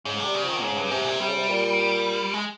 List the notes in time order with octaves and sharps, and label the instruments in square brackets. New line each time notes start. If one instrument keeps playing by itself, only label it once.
[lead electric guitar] G#2 [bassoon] C#3
[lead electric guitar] C3 [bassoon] G3
[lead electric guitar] C#3
[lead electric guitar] D#3 [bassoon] F3
[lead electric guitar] G#2 [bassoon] C#3
[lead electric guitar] G2
[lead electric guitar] G#2 [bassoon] C3
[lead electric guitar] A#2
[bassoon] C3 [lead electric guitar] G3
[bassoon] C#3
C3
A#2
[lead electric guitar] G#3